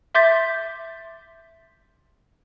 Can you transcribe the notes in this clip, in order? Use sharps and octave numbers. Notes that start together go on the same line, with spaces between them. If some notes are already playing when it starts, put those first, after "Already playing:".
E5 C6 D6 G6 A6 B6